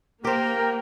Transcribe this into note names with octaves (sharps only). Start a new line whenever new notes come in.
A#3 G4 A#4 C5 G5